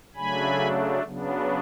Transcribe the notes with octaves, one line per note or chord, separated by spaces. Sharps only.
C#3 F#3 A3 D4 G#5 B5
C#3 F#3 B3 D4